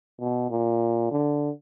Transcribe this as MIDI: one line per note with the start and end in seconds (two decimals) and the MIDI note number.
0.20 0.48 47
0.50 1.10 46
1.11 1.49 50